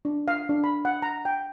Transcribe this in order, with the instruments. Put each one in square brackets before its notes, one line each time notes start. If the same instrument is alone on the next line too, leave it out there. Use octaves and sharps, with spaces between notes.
[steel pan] D4
F5
D4
B5
F#5
A#5
G5